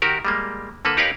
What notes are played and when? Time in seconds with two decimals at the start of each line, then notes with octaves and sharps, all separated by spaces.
0.02 D#3 F#4 G4 A#4
0.25 G3 G#3 A#3
0.85 D3 A#3 A4 B4
0.97 D#4 G4 A#4 B4 C#5 F5